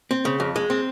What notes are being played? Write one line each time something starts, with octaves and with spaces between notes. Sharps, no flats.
C4
C#3
F2
G#3
C4